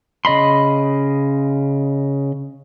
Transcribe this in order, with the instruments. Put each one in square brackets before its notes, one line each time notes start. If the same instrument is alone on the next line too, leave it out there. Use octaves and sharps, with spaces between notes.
[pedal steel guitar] C#3 D#5 B5 C6